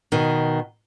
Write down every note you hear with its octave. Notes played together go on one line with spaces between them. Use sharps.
B2 D#3